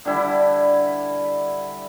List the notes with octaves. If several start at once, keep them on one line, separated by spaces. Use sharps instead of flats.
D3 G3 E4